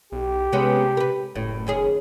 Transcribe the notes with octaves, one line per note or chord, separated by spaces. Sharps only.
B1 G4
C3 G#3 B3 C#4
A#4 B4
F#1 A2
D#2 C#4 G#4